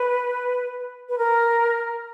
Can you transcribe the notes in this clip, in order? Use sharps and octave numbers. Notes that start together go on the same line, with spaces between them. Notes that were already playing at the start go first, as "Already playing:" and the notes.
Already playing: B4
B4
A#4